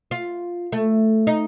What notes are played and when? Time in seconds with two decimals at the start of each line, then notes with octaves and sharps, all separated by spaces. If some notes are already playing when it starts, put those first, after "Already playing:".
0.11 F4
0.72 A3
1.27 D#4